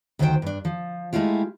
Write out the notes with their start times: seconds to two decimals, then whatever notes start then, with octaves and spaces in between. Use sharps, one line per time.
0.19 D2 D#3 F#3 B4 C5 G5
0.42 G2 D4
0.65 F3
1.13 G#3 A3 E4 F4 G4